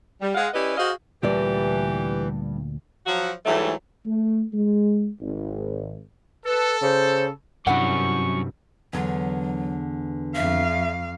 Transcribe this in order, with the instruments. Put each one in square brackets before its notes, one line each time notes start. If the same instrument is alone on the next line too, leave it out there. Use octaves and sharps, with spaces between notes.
[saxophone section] G3
G#3 F5 F#5
C#4 E4 G4 B4 D5 D#5
F#4 G#4 C5 D#5 F5
[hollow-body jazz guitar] D2 A#2 D5 [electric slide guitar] G2 G3 [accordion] E3 [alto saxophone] G4
[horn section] F3 F#3 F#4
G#2 E3 F#3 G3 A3
[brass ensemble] A3
G#3
G#1
[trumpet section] A4 [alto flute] B4
[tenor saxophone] C#3 [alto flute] C5
[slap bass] G2 C3 [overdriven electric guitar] F#3 C#4 [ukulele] D4 E4 F#5 [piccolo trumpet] C#6
[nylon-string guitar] E2 D3 [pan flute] F#3
[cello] F2 F5 [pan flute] E5